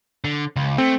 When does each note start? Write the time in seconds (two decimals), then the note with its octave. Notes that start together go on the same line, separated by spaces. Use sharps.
0.24 D3
0.56 C#2
0.78 A3 C4